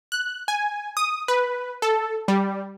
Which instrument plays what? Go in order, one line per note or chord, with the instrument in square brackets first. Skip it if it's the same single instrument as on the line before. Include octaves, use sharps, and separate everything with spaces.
[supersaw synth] F#6
G#5
D#6
B4
A4
G3